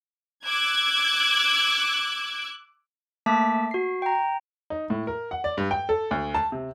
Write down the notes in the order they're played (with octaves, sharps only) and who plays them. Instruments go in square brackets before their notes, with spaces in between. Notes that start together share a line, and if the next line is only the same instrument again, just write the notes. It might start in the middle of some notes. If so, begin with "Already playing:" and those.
[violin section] D6 E6 F#6 G#6
[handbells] A3 A#3 E5 A5 D6 B6
F#4 C7
G5 A#5
[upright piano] D#4
A2
A#4
F#5
D5
G2
G5
A4
D2
A5
C3